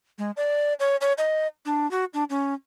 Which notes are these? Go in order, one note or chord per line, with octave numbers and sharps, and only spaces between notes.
G#3
D5
C#5
C#5
D#5
D4
F#4
D4
C#4